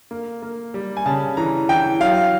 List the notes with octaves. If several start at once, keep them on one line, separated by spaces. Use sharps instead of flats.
A#3
A#3
G3
G#5
C#3 A5
E3 A#5
E3 G5
F#3 F5